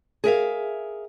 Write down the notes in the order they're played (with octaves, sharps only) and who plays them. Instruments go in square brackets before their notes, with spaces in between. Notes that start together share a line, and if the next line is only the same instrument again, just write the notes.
[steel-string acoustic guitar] G#4 A#4 E5 F5